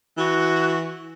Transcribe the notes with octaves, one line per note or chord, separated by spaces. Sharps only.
E3 F#4